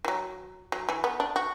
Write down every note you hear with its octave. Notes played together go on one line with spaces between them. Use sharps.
E3
F#3
F#3
E3
B3
D4
F#4